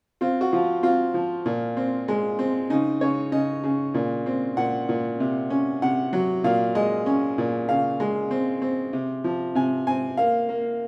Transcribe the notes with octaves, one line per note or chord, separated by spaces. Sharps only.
C4 F4
F#4
F3 F4
C4 F4
F3
A#2
C4
G#3
C4
C#3 D#4
C#3 C#5
C#3 D#5
C#3
A#2
C4
A#2 F#5
A#2
C3
C#4
C3 F#5
F#3
A#2 F5
G#3 D#5
C#4
A#2
C#3 F5
G#3
C4
C4
C3
F3
C3 G#5
C4 G#5
A#3 F5
A#3